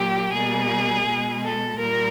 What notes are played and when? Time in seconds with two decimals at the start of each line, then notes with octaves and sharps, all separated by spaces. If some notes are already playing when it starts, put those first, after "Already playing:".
Already playing: A#2 F#3 A#3 G4
0.33 B2 G3 A#3 G#4
1.06 B2 G#3
1.43 A4
1.78 A#2 G3 A#3 A#4